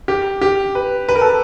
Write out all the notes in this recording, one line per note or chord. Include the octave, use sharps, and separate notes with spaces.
G4
G4
B4
B4
A#4
A4